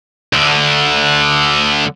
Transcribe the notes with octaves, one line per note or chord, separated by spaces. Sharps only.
D2 D3